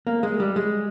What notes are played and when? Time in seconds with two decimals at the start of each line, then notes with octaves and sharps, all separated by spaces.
0.07 A#3
0.23 G#3
0.40 G3
0.56 G#3